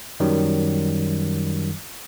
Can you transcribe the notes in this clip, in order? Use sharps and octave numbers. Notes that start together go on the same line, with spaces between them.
F#2 D#3 F#3 G3